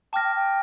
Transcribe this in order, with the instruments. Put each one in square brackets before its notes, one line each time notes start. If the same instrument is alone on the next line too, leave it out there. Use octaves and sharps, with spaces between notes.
[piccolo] G5 [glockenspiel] A5 D6 F6 A#6
[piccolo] G5
G5